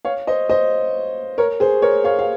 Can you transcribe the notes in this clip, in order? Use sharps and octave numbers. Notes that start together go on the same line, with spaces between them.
C#5 F5
C5 D#5
C5 D#5
A#4 C#5
G#4 C5
A#4 C#5
C#5 F5
F5